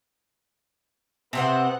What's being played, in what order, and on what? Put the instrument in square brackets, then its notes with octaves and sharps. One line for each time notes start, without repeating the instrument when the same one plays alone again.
[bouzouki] C3 C4 C5 [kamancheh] B3 F#5